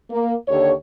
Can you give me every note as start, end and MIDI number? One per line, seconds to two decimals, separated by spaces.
0.10 0.33 58
0.48 0.72 39
0.48 0.72 50
0.48 0.72 67
0.48 0.72 73